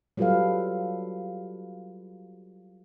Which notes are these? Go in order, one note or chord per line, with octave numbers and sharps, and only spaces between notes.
F#3 G3 F4 A4 B4 F5